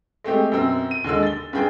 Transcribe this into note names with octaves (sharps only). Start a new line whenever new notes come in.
G#3 A3 C4 G4
F#2 B2 C4 E6
D#7
D#2 D3 G#3 E6
A6 G7
G2 D4 G#4 G5